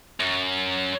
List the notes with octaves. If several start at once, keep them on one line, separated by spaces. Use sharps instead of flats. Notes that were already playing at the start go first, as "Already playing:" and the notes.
F#2